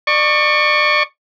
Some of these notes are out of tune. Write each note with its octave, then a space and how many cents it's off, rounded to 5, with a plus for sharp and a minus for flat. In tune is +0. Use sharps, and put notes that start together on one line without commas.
D5 +30 C#6 +0